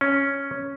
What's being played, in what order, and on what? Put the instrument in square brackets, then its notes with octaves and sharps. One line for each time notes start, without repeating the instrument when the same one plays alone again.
[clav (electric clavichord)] C#4